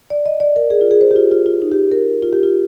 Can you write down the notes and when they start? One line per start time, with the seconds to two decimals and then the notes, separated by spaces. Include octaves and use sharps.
0.10 D5
0.26 D#5
0.40 D5
0.56 A#4
0.70 G#4
0.81 F4
0.91 G#4
1.01 C5
1.11 G4
1.16 F4
1.32 F4
1.46 F4
1.62 D#4
1.72 G4
1.92 A#4
2.23 F4
2.33 G4
2.43 F4